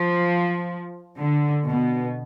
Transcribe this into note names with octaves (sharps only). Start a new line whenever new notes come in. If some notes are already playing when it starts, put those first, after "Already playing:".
Already playing: F3
D3
B2